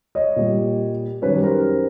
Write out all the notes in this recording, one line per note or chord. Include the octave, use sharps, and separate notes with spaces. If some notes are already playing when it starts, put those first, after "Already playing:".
C#5 D#5
A#2 G3
F#2 D#3 G3 B4 C#5
A#4 C5